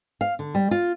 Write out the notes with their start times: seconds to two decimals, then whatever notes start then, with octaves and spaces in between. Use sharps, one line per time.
0.21 F5
0.39 D3
0.55 G3
0.71 F4